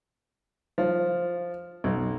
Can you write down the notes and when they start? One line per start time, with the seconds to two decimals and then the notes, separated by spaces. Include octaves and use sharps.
0.78 F3
1.84 B1